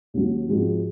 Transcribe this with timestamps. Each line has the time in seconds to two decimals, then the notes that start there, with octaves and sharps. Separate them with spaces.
0.14 D#2 D#3 F#3 C#4
0.48 G#2 F3 G#3 C4 F#4